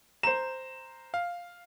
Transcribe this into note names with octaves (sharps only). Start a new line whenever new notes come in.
C5 A#5 E7
F5